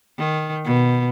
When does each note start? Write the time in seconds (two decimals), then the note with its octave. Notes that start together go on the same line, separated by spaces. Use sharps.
0.18 D#3
0.65 B2